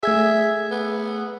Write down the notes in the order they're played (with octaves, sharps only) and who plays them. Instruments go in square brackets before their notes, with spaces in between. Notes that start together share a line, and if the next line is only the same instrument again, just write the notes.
[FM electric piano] A3 G#4 [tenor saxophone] E5 [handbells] E6 G#6
[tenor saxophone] B3